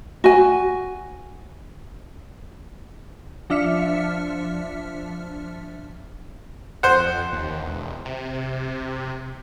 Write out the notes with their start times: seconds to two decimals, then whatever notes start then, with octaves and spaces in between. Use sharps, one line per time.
0.24 F#4 G#5
3.50 F3 D4 E5 F6 B6 C#7
6.83 F2 C5 F#5
7.32 D#2
7.62 E1
8.05 C3